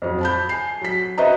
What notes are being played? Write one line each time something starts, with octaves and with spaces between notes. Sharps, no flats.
F2 F#3
A5 B5 G6
G#5 C7
F#3 B6
F#4 B4 C5 D#5 E5 A#5